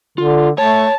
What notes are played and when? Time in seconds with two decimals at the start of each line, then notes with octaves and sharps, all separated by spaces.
0.18 D3 F4
0.58 A3 C#5 A5